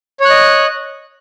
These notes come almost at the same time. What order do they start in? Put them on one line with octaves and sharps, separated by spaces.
C#5 F#6 D#5